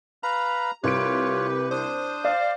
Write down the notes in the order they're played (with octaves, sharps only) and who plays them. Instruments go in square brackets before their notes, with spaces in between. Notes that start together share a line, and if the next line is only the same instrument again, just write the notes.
[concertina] B4 F5 B5 [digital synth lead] A#5
[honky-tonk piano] C2 D7 [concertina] F4 C#5 [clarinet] G4 [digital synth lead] B4
[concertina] D4 D#6 [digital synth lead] C5
[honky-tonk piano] D5 [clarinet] F5